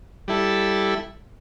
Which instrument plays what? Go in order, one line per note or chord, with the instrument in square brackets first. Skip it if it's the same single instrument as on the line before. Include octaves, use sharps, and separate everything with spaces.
[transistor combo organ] G3 E4 A4